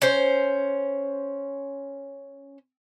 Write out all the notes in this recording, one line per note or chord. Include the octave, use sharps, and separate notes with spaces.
C#4 C5